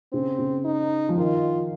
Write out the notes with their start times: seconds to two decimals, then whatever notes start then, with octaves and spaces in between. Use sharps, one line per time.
0.13 C#3 C4
0.39 C#3
0.65 D#4
1.09 F3
1.18 D#3 F4